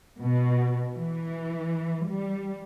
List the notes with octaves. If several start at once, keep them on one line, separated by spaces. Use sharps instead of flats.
B2
E3
G3